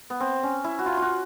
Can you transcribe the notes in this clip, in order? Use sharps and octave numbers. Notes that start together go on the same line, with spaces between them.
B3
C4
C#4
E4
F#4
F4
F4 F#4